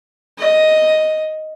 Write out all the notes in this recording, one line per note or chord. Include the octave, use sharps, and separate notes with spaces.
D#5